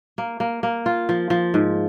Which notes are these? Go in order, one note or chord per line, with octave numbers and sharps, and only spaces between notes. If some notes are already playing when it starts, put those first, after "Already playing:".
A#3
A#3
A#3
F4
F3
F3
G#2